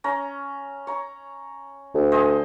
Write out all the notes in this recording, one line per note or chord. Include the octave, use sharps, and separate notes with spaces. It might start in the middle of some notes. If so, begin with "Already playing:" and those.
C#4 A#5
C#5 A#5
D2
C5 D#5 G#5